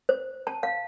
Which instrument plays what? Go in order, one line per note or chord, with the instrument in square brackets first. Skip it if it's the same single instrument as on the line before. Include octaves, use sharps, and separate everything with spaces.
[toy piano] C5
A5
F5